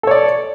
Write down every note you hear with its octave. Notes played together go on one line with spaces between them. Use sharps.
A4 C#5 D5